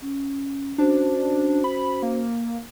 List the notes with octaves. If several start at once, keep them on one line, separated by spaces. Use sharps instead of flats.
C#4
C#4 D4 F#4 C5
B5
A#3